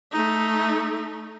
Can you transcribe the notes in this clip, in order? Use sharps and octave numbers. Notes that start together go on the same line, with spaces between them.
A3 D#4